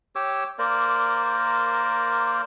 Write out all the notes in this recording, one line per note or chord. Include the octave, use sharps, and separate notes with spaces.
G4 C#5 D6 E6
A#3 A#4 C5 D5